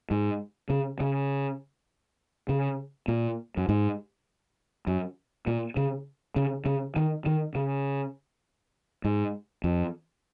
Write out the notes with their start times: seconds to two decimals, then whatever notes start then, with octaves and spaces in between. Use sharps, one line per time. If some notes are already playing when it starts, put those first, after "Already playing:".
0.11 G#2
0.70 C#3
1.00 C#3
2.49 C#3
3.08 A#2
3.57 F#2
3.69 G#2
4.87 F#2
5.47 A#2
5.77 C#3
6.36 C#3
6.66 C#3
6.96 D#3
7.26 D#3
7.55 C#3
9.04 G#2
9.64 F2